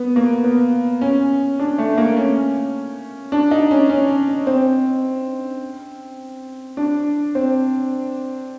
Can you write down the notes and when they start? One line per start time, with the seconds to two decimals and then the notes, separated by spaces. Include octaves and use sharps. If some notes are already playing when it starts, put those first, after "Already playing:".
Already playing: B3
0.16 A#3
0.44 B3
1.01 C#4
1.60 D4
1.78 A3
1.98 A#3
2.16 C#4
3.32 D4
3.51 D#4
3.71 C#4
3.90 C#4
4.47 C4
6.77 D4
7.35 C4